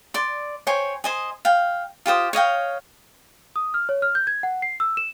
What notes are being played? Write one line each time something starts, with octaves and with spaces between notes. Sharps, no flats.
D5 C6
C5 C#5 G5 G#5
C5 D#5 G#5
F5 G5
F4 G4 C5 D#6
C#5 D#5 F5 G5
D#6
F6
C#5
F6
G6
G#6
F#5
C7
E6
E7